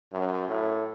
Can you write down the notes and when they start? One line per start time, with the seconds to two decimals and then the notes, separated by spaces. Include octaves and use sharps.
0.13 F#2
0.48 A2